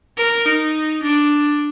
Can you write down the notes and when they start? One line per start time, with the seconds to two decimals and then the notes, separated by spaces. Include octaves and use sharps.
0.18 A#4
0.46 D#4
1.03 D4